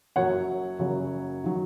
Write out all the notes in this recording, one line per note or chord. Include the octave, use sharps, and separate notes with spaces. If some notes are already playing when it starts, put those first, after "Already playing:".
F#1 F#2 F#3 C#5 F#5
F#1 F#2 C#3 F#3
D#3 F#3